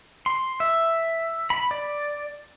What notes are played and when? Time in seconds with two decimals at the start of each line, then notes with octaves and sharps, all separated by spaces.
0.26 C6
0.60 E5
1.50 B5
1.71 D5